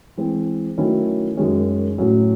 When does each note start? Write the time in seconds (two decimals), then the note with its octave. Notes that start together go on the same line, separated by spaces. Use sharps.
0.17 E3 G#3 C4
0.78 D#3 F#3 A3 C#4 E4
1.37 F#2 D#3 G#3 C#4
1.98 A2 F#3 C#4